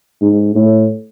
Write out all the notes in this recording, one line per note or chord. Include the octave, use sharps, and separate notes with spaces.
G#2
A2